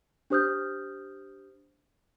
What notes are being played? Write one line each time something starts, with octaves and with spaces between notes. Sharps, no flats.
D4 G4 C5 D#6 F6 G6